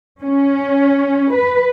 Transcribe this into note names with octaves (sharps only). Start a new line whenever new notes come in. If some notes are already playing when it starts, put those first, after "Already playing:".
C#4
B4